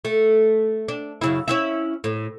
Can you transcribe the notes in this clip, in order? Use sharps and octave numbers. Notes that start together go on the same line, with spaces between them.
A3
D4
F#2 C#3 E4
C#4 E4 E5
A2